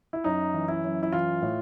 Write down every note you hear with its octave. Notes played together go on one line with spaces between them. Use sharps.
E4
F#2 D#4
E3
E4
F#2
E4
E3 F4
A2